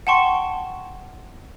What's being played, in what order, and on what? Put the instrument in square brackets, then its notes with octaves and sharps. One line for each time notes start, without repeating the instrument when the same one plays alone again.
[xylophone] F#5 G5 A5 C6 C#6